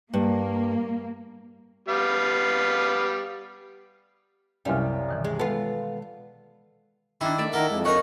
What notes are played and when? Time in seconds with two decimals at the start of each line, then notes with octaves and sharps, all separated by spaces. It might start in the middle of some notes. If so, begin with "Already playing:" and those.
0.13 G2 A#3
1.89 G3 B3 F5
4.65 C2 F#2 G3 F5 G#5 F6
5.09 B2 D#3 E3
5.24 G#3
5.39 G#3 B3 F4 A4
7.21 D#3 A#3 D4 E4
7.38 A3 D5 E5
7.53 D#3 E4 A4 A#4 F#5
7.70 F2 G#3
7.85 D#4 A#4 C#5 D#5 F#5